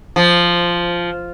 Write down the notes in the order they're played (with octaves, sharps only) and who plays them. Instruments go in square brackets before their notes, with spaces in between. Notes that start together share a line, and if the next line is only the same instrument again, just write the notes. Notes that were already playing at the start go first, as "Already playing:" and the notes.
[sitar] F3